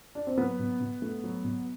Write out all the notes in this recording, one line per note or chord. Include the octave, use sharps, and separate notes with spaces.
D4
C4
F#3 B3
B2
B2
A3
F#3
B2